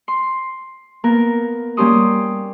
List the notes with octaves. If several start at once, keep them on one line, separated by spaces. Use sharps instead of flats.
C6
A#3 B3 A#4
G3 A#3 C#4 G4 C6 D#6